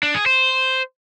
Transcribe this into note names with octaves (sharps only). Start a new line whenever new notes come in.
D4
G#4
C5